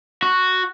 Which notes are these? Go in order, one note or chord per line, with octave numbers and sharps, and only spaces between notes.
F#4